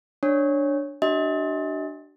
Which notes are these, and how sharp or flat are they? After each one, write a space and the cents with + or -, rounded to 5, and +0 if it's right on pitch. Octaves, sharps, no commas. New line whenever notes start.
D4 +0 C#5 -10
D4 +10 F#4 +45 D#5 +45